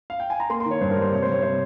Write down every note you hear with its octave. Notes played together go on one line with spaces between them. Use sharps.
F5
G5
G#5
A#5
A#3 C6
C6
D#3
C#5
G2 C5
G3 A#4
C5
C3 C#5
G3 C5
C#5
C3 C5